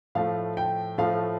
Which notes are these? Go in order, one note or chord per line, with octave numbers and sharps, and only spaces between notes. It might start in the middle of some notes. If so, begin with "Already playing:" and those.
A2 F3 A3 F5
G5
A2 F3 A3 F5